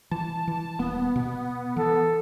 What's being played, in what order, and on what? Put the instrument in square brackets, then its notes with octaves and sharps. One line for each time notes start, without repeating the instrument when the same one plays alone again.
[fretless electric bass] E3 [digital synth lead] A5
[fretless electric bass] E3
[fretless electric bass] D#1 A#3 [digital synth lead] B3
[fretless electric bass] B2
[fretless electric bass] E3 [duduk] A4